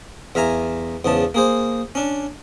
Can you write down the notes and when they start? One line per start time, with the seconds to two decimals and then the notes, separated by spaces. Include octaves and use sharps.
0.35 E2 E5 F5 G#5 A#5
1.05 E2 G#2 C#3 A5
1.34 A#3 G#4 C5
1.95 C#4 D4